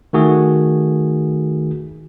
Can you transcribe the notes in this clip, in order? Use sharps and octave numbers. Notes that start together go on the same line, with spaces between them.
D#3 A3 F#4 G#4